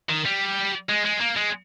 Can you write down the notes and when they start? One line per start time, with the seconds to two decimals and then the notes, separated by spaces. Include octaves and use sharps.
0.10 D#3
0.25 G3
0.89 G#3
1.05 G#3
1.21 A#3
1.37 G#3